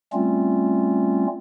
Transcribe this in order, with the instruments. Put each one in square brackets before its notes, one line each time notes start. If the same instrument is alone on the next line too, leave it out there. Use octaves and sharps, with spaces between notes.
[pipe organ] G3 A3 C4 C#4 F4